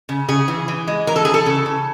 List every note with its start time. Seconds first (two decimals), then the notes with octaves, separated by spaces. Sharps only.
0.09 C#3
0.28 C#3 G#4
0.48 E3
0.68 E3
0.87 G#3
1.07 E3 A#4
1.16 A4
1.25 E3 G#4
1.34 A4
1.46 C#3
1.66 C#3